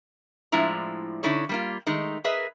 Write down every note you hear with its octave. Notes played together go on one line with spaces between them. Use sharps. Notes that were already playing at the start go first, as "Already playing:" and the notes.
A2 F3 G#3 D4 E4 A#5
D3 C#4 D#4 E4 A4 C#5
G3 A#3 F4
D#3 G#3 A3 D#4
G#4 A#4 B4 D#5 E5